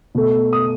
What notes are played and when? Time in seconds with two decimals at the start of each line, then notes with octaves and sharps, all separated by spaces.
0.15 B2 A3
0.53 D#6